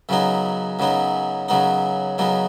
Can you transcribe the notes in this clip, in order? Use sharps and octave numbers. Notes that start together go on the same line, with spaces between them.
F#2 C#3 F#3 B3 D#4
F#2 C#3 F#3 B3 D#4
F#2 C#3 F#3 B3 D#4
F#2 C#3 F#3 B3 D#4